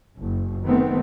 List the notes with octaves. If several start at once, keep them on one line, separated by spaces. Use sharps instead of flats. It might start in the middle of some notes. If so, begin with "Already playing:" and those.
F#1
D#3 G#3 A3 B3 C4